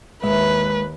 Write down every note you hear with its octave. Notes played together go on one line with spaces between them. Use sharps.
G1 D#2 G#3 B4 E5